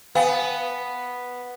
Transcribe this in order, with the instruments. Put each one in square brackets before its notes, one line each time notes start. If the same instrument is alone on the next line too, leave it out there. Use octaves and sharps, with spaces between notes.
[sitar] B3 [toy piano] F5 G5 G#5